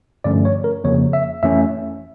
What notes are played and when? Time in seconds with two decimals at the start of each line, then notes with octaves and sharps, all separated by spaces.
0.24 G2 D3 F3 A3 C#4 D5
0.45 C#5
0.64 A#4
0.84 F2 C#3 F3 A#3 C#5
1.13 E5
1.43 F2 E3 A3 C#4 E5